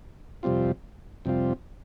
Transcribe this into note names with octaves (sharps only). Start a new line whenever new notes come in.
F2 C3 G3 C4 F4
F2 C3 G3 C4 F4